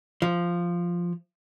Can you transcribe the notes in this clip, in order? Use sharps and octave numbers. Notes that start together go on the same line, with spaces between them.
F3